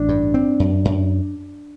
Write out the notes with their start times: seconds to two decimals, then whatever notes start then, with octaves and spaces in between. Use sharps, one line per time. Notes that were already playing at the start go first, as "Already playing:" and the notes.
Already playing: A1 D4
0.09 G2
0.34 C4
0.60 F#2
0.85 F#2